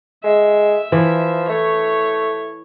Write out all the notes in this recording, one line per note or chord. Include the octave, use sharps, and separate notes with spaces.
G#3 E5
E3 F3
A3 C#5